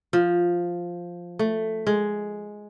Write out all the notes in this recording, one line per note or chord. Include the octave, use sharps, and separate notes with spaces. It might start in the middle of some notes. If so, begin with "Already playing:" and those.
F3
A3
G#3